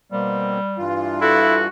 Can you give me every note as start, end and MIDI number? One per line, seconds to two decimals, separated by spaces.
0.12 0.60 47
0.12 0.84 55
0.12 0.60 58
0.12 0.60 60
0.78 1.68 43
0.78 1.68 52
0.78 1.68 65
1.21 1.56 64
1.21 1.65 66
1.21 1.62 69